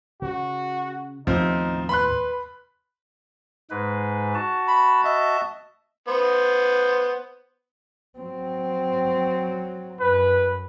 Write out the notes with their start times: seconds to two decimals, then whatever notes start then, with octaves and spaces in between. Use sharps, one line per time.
0.22 C#3 F#4
1.27 D#2 A2 F3 B3 C4 D#4
1.89 B4 B5 C6 F#6
3.70 G#2 G#3 B4
4.35 F#4 A5
4.68 B5
5.04 D#5 E5
6.08 B3 C5
8.19 F#3 C4
10.01 F#2 B4